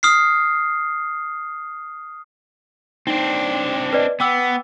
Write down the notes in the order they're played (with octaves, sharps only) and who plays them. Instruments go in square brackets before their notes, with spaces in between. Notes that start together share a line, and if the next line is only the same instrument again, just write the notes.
[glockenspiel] D#6 F6 C7
[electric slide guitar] C4 D4 [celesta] D#4
[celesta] B4 D5 D#5
[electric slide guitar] B3 [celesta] G5 D6 E6